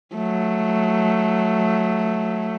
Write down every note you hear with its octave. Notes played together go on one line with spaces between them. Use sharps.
F#3 A3